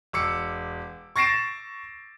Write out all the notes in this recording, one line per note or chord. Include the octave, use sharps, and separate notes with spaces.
E1 D6 E6 C#7
C#6 A6 A#6 C7 D7 E7